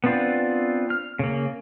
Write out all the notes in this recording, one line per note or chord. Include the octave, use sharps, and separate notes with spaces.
B3 C4 D4 F4
F6
C#3 A#3